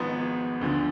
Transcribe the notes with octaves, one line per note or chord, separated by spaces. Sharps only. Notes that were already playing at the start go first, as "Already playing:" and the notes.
Already playing: G#1 G#2 F3 B3
D2 D3 F3